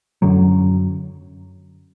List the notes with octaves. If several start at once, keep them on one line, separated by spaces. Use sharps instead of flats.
F#2 D3 F#3